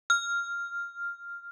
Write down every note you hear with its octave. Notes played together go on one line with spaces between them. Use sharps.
F6